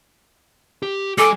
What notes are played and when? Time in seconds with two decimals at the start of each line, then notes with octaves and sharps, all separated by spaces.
0.83 G4
1.18 G3 A4 G#5 D6